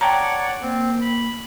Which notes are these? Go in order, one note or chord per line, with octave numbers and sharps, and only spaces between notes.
C#5 D5 F#5 G5 A5 A#5
A#3 C4
B5